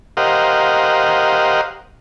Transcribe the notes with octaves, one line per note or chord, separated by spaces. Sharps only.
G4 A#4 C5 D#5 F5 F#5